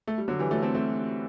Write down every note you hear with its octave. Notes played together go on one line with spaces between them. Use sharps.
A3
G3
D3 F#3
E3 G3
F#3 A3
A3 C4
A3 C4